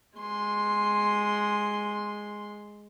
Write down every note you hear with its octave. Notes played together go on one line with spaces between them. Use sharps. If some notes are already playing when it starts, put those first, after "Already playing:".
G#3 C6